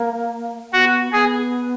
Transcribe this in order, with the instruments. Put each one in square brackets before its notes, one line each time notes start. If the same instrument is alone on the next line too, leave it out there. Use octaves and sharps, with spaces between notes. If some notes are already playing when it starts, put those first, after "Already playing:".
Already playing: [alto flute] A#3
[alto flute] B3 [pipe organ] F#4
[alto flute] B3 [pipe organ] G#4